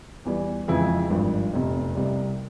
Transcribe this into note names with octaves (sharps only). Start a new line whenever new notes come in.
E2 E3 G3
F2 C#3 E3 G#3 E4
G#1 G2 F3
F1 E2 C3
C2 C3 G3